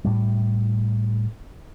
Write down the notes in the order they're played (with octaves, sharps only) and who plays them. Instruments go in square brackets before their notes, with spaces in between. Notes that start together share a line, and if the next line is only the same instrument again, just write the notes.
[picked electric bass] A2 G3